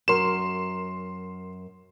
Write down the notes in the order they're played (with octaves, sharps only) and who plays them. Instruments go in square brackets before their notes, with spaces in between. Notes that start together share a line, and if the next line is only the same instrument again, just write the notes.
[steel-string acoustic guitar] F#2 A#4 [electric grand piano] C6 E7